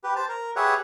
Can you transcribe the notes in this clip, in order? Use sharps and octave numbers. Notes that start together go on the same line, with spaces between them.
G4 B4
C5 A5
A#4
G4 G#4 B4 C#5 E5 F#5